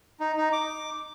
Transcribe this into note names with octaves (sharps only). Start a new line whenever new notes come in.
D#4
D#4
D6